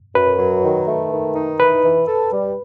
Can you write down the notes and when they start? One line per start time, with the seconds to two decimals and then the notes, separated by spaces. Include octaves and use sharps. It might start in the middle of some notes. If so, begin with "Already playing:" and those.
0.15 F#2 B4
0.39 F#3
0.63 D#3
0.87 A3
1.12 D#3
1.36 D#4
1.60 E3 B4
1.84 E3
2.08 A4
2.32 G3